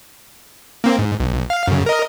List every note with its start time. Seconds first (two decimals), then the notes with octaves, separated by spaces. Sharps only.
0.84 A#3 C4
0.99 G#2
1.20 B1
1.50 F5
1.67 F#2 C#3
1.86 A#4 D#5